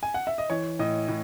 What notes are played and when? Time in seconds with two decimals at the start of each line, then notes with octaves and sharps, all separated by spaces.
0.03 G#5
0.14 F#5
0.27 E5
0.38 D#5
0.50 E3 C#5
0.79 A2 D#5
1.08 A2